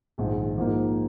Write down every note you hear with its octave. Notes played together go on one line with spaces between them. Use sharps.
A#1 G#2 D#3
G#2 F3 A#3 D#4